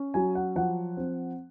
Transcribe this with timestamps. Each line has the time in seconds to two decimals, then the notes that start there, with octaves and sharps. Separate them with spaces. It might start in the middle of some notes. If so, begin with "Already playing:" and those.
Already playing: C#4
0.14 F#3 G#5
0.35 F#5
0.56 F3 F#5
0.97 C4